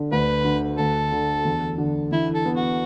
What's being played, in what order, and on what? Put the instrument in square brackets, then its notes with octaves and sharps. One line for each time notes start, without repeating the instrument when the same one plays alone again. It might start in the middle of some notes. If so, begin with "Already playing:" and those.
Already playing: [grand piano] D3
[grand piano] D2 [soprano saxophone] B4
[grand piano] D3
[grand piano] D2 [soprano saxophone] A4
[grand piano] D3
E2
D3
[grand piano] E3 [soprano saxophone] E4
[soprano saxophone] A4
[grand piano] B3
[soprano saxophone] F#4